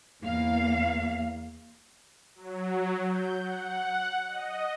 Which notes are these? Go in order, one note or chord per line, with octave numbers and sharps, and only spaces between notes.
E2 A#3 F5
F#3
G6
F#5
D#5